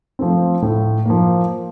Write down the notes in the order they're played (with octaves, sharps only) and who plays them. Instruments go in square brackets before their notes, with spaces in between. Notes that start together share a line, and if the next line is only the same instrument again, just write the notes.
[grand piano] F3 A3 C4
A2
F3 A#3